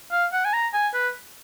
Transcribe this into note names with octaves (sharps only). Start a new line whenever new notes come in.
F5
F#5
G#5
A#5
G#5
B4